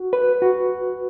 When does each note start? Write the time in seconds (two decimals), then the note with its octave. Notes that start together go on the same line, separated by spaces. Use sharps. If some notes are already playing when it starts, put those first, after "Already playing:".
Already playing: F#4
0.13 B4
0.42 F#4